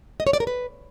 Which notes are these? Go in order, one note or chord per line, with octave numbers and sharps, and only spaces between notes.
D#5
C#5
D5
A#4
B4